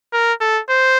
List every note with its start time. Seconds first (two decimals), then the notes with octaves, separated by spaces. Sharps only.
0.13 A#4
0.41 A4
0.69 C5